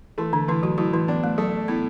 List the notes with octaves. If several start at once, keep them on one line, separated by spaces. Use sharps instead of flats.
E3 A3 E4
D3 D4
A2 E3 E4
F#3 F#4
A2 F#3 F#4
E3 E4
B3 D4
A3
F#3 A3
A2 B3